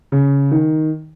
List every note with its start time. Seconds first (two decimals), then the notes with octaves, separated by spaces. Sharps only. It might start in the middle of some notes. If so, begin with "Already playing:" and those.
0.12 C#3
0.52 D#3